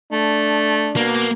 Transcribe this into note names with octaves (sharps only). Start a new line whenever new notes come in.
A3 D4
B2 A#3